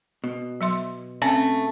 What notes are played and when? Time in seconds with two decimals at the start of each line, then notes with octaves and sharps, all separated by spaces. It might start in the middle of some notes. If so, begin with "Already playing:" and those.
0.24 B2
0.61 F#3 E5 C6
1.22 A3 C4 C#4 G#5